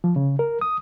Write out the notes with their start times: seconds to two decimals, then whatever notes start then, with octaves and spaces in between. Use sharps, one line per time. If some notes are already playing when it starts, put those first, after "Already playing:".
0.04 F3
0.16 C#3
0.39 A#4
0.61 D#6